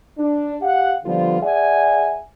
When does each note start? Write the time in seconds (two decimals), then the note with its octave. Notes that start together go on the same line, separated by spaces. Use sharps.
0.18 D4
0.61 G4 F5 F#5
1.05 D3 F3 G3 B3 F4
1.41 G#4 D5 E5 F#5 G#5